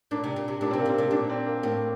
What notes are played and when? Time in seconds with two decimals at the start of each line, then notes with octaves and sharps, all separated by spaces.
0.11 A#2 D4
0.24 C3
0.36 A#2
0.48 C3
0.61 A#2 D4
0.71 C3 C4
0.80 A#3
0.86 A#2 C4
0.98 C3
1.11 A#2 D4
1.30 C4
1.46 A#3
1.58 A#3
1.63 A2 C4